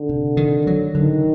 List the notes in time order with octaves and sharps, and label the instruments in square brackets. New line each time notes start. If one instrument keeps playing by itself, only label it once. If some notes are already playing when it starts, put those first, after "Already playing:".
Already playing: [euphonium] D3
[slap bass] C3
D#3
F#3
[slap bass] D3 [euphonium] D#3